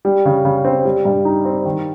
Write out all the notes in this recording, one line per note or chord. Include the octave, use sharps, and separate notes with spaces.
G3
C#3
C#3
C4
G3
G2
D#4
C4
D#3